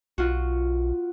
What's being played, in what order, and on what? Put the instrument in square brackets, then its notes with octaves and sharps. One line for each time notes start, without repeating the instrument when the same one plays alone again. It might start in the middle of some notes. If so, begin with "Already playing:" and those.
[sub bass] B1 [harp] F4 F#4